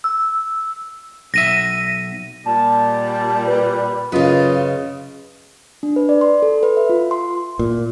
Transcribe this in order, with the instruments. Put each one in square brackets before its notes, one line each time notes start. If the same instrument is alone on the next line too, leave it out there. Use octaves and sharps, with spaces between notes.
[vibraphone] E6
[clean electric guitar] B1 E5 [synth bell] A#6 D#7
[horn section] A#2 G3 [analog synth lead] A5
[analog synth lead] B4
[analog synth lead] F#2 [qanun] C#3 B4 [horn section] F4 D#5
[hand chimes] D4
B4
D5
C6
A4
B4
E5
F4
C6
[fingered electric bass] A#2